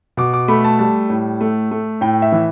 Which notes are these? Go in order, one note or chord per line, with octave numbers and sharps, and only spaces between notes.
B2 D6
D6
A3 B5
A5
G3 A5
A2
A3
A3
A2 G5
E5
E3